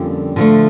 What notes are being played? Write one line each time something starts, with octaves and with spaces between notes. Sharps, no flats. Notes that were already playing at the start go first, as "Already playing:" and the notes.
Already playing: F2 D3 G3 A#3 C#4
D3 F3 A3